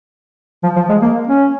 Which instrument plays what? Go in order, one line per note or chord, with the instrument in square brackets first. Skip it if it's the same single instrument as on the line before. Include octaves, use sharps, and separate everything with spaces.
[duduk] F3
F3
G#3
A#3
C#4